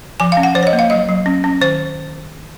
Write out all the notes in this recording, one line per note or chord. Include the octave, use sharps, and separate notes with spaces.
F3 G#5
F5
C#4
F#5
F3 C5
C#5
D#5
A#3
F5
F#3 D#5
F#3
C#4
C#4
D#3 C5